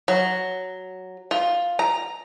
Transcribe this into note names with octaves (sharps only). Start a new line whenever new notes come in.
F#3
F4
A#5